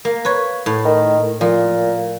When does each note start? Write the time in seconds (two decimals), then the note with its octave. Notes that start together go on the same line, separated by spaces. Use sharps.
0.05 A#3
0.25 B4 C#5
0.66 A2
0.85 D#3
1.41 A#2 F3